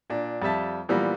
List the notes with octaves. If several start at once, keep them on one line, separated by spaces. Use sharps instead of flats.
A#2 D4
F2 G3 E5 A5
A#2 E3 F3 G3 A#3 B3